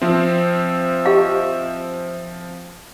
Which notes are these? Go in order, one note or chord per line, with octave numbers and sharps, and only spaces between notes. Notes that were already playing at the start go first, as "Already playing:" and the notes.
F3 C4 E5
G4 D#5 F5